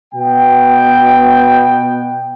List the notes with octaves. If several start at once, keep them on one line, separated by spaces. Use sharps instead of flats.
B2 B3 G5